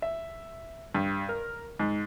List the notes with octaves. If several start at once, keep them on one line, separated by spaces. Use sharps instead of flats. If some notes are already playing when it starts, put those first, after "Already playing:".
E5
G2
A#4
G#2